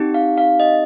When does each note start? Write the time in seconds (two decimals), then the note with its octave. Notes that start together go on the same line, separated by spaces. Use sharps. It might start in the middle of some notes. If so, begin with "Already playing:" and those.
Already playing: C4 D#4 G4
0.14 F5
0.38 F5
0.60 D#5